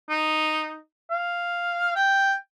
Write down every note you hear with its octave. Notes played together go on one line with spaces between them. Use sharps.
D#4
F5
G5